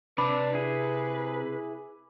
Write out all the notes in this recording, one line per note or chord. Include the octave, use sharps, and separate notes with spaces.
C3 D4 B4 B5 D6
E4 G#4